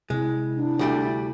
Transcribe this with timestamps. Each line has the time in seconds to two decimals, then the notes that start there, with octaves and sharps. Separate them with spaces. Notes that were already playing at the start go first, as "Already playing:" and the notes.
0.10 C3 G#3 E4
0.57 D4
0.79 D2 G3 A3